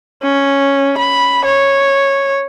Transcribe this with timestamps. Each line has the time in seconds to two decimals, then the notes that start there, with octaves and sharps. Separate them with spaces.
0.23 C#4
0.98 B5
1.45 C#5